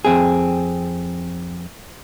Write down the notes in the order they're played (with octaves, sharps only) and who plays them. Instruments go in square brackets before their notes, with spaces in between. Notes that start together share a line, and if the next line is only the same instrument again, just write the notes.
[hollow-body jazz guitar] F2 C4 G#4